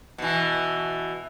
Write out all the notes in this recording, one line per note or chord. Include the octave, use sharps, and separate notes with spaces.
B2 E3